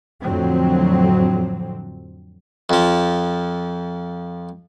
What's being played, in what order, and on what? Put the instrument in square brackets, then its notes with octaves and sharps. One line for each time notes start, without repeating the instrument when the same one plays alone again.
[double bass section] F2 A2 D3 F#3 C4
[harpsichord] F2 F3